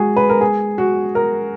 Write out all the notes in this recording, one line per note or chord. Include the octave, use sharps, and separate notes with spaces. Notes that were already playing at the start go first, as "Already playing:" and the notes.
Already playing: G#3 F#4 G#4
B4
A#4
G#4
F#4
A#4